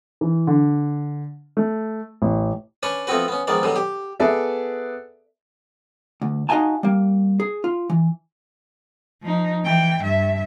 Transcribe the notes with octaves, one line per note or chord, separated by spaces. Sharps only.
E3
D3
A3
A1
C#4 D4 B4 C#5
F3 A3 B3 C4 F#4 B4
B3 C#4
A#1 D#3 G#3 B3 D5
B2 D3 F#3 G3
G4
B3 G#4 A4 B4 D5 E5
D2
D#4 F#4 D#5 F5 G#5 A5
G3 A#3
G#4
F4
E3
F3 D#4
E3 G5
G2 E5